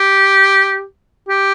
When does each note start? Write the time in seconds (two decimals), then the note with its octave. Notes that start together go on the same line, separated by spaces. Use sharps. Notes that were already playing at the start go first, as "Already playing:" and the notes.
Already playing: G4
1.29 G4